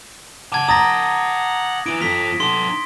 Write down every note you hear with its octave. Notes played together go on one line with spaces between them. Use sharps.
F#5 A5 D6 G#6
A#5 D#6 A6 A#6
E4 B4 D7
F4 A4 B6
D#4 A4 C6